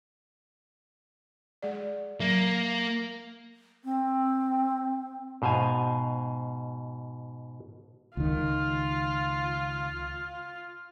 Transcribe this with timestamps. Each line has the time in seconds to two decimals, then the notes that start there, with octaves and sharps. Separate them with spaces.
1.63 G#3 G#4 D5
2.20 F#3 A#3
3.84 C4
5.42 G#2 B2 C5 F5 G#5
8.17 C#2 D#3 F4